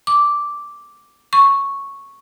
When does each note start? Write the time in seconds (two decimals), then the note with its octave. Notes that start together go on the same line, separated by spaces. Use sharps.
0.07 D6
1.33 C#6